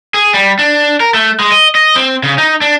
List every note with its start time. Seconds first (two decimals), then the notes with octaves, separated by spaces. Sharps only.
0.14 G#4
0.34 G3
0.59 D4
1.00 A#4
1.14 A3
1.40 G#3
1.52 D#5
1.75 D#5
1.96 C4
2.23 C#3
2.38 D#4
2.61 D4